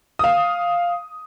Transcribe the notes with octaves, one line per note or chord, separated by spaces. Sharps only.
F5 D#6